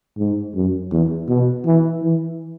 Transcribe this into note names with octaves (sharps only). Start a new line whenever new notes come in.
G#2
F#2
E2
B2
E3
E3